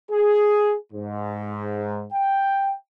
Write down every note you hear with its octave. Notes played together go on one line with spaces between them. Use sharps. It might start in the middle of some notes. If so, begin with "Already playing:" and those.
G#4
G#2
G5